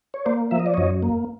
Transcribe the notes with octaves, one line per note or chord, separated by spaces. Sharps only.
C#5
A#3 C5 D5
F3 E5
D#5
D5
F#2 C#5 D#5
A#3